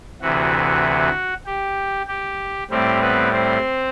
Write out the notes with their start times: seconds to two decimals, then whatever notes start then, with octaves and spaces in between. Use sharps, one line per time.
0.21 D2 C3 E3 F#4
1.46 G4
2.08 G4
2.71 A2 G3 C4 G4
3.01 B3 B4
3.32 C4 C5